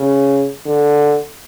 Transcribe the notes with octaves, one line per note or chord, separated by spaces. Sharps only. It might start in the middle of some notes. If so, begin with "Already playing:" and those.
Already playing: C#3
D3